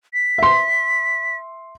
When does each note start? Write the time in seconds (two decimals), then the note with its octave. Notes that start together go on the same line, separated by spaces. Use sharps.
0.14 B6
0.38 E5 C6